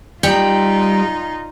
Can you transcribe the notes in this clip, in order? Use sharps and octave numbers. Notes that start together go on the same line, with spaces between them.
G3 D#4 F4 G5